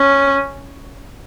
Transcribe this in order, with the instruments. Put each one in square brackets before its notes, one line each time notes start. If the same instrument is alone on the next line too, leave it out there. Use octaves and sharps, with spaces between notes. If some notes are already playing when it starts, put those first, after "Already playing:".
Already playing: [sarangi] C#4